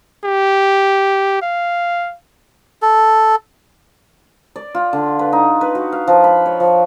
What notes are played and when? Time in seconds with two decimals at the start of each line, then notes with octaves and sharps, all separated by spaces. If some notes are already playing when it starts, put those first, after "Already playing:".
0.24 G4
1.42 F5
2.82 A4
4.56 D5
4.75 F4
4.93 D3
5.19 B4
5.33 D#4
5.61 B4
5.75 F#4
5.92 F5
6.07 F3
6.24 B5
6.46 C#5
6.60 F3